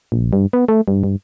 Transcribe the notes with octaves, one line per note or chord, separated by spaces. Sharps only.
A#1
G2
B3
A3
G2
G2